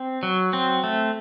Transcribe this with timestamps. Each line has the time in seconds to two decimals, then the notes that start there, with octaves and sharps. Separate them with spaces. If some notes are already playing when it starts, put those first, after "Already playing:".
Already playing: C4
0.23 F#3
0.53 C4
0.84 A3